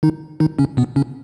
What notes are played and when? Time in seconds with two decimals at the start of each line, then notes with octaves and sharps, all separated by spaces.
0.03 D#3 D#4
0.40 D#3 D#4
0.59 C#3 C#4
0.77 B2 B3
0.96 C#3 C#4